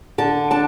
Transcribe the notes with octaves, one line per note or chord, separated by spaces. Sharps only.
D3 A5
D4 A5